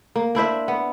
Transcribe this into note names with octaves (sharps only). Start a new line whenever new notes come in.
A#3
D4 E4 C5 E5
B3